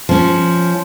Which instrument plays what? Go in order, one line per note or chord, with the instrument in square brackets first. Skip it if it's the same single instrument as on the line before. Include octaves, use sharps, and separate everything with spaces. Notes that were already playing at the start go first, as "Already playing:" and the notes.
[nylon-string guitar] F3 C#4